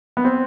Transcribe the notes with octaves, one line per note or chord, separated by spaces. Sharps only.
B3
C4